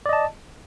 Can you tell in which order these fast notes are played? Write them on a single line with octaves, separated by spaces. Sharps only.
D5 D#5 A5